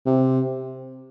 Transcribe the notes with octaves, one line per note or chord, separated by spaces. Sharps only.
C3